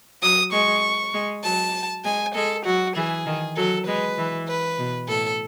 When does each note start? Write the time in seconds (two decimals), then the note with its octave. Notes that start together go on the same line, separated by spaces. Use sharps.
0.22 F#3 D#6
0.52 G#3 C#6
1.14 G#3
1.44 F#3 A5
2.05 G#3 G#5
2.35 G#3 A4
2.66 F#3 F#4
2.96 E3 G#4
3.26 D#3
3.57 F#3 A4
3.87 G#3 B4
4.18 E3
4.48 B4
4.78 B2
5.09 A2 A4